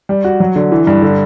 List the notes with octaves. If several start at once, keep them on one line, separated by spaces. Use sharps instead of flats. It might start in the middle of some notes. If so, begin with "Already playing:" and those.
G3
F#4
F#3
D3
E3
G2
D3